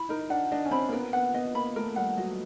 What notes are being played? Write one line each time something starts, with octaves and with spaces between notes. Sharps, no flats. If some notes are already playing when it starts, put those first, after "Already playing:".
Already playing: E4 B5
D#4 A#4
D4 F#5
D4 D#5
C#4
C4 B5
A#3
B3 A#4
B3 F#5
B3 D#5
A#3 B5
A3 A#4
G3 F#5
F#3 D#5